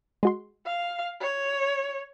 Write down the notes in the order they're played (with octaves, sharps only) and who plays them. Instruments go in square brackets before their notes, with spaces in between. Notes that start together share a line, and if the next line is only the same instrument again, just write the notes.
[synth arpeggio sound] G#3 F#4 C6
[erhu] F5
C#5